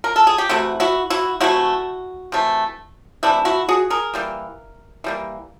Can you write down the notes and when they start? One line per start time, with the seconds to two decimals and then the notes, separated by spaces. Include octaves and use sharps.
0.04 A#4
0.16 A4
0.27 G#4
0.38 G4
0.49 C3 E3 A3 E4 F#4
0.80 E4 F#4
1.10 E4 F#4
1.41 C3 E3 A3 E4 F#4
2.32 C3 E3 A3
3.23 C3 E3 A3 D4 E4
3.45 E4 F#4
3.69 F#4 G#4
3.90 G#4 A#4
4.14 E3 G3 A#3
5.04 E3 G3 A#3